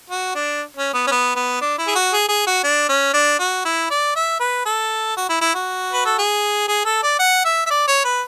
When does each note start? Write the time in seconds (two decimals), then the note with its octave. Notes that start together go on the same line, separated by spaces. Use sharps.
0.10 F#4
0.35 D4
0.77 C#4
0.94 B3
1.07 C#4
1.11 B3
1.36 B3
1.61 D4
1.78 E4
1.87 G#4
1.95 F#4
2.13 G#4
2.29 G#4
2.47 F#4
2.64 D4
2.89 C#4
3.14 D4
3.39 F#4
3.65 E4
3.90 D5
4.15 E5
4.40 B4
4.66 A4
5.17 F#4
5.29 E4
5.41 E4
5.55 F#4
5.93 B4
6.05 A4
6.18 G#4
6.68 G#4
6.85 A4
7.03 D5
7.19 F#5
7.45 E5
7.66 E5
7.70 D5
7.87 C#5
8.04 B4